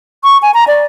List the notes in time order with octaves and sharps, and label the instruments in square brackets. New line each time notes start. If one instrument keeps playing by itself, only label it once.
[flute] C#6
G#5
A#5
D5